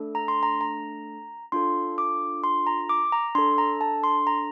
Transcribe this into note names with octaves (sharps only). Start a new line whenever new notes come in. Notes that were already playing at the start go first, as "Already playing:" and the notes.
Already playing: A3 D4 A4
A#5
C6
A#5
A#5
D4 F4 A4 C6
D6
C6
A#5
D6
A#5
D4 A4 C6
A#5
A5
C6
A#5